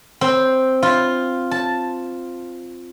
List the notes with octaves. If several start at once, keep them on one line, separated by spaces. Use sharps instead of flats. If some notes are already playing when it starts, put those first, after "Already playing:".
C4
F4
A5